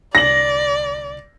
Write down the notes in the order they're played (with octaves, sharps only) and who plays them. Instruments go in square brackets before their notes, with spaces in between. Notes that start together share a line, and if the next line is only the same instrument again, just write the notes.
[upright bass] C2 D3 [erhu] D5 [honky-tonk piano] A#6 F#7